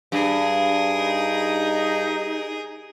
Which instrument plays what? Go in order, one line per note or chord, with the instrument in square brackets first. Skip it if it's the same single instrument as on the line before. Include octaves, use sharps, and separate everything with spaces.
[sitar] G2 [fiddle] G#4 A#4
[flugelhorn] D#4